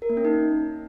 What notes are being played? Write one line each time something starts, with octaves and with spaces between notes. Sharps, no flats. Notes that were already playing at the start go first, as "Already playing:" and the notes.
A#4
A#3
C#4
D#4